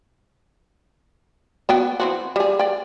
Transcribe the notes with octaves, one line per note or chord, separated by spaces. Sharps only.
B3 F#4 G5
E3 C4 F#4
G3 G#4
D5 G5